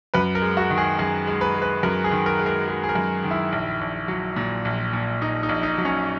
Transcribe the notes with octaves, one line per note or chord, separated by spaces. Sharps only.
F#2 B4
A#4
G#3
F#4
D#3
G#4
F#2 G#4
G#3
B4
G#3
B4
F#2 A#4
G#4
D#3
A#4
G#3
A#4
G#3
G#4
A#4
F#2
D#3
E4
A#1
A#1
F#3
A#2
A#1
A#2
A#2 D#4
D#4
A#1
D#4
F#3
C#4